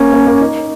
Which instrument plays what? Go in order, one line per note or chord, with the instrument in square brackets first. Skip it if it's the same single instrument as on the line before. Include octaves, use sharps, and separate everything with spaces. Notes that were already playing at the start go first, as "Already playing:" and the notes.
Already playing: [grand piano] A#3 [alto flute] C#4
[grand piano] A#3
A#3
D#4